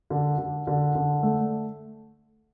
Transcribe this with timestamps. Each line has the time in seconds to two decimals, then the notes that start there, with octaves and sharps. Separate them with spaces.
0.10 D3
0.38 D3
0.67 D3
0.95 D3
1.23 A3